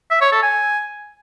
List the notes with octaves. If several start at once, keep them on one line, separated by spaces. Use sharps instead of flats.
E5
C#5
A4
G#5